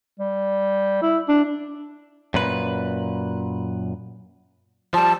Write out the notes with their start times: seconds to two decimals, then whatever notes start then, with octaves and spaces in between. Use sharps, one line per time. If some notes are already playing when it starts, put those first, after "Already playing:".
0.19 G3
1.02 E4
1.29 D4
2.34 F#2 A#2 B4
4.94 F3 G3 A5